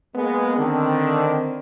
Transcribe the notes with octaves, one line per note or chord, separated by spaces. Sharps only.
G#3 A#3 B3
D3 D#3 C4